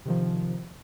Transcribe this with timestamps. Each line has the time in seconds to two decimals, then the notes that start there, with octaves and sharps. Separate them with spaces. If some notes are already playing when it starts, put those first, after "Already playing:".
0.05 C3 D#3 F3